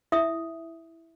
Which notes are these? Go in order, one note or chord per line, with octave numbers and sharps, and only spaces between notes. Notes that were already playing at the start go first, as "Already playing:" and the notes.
E4 E5 D#6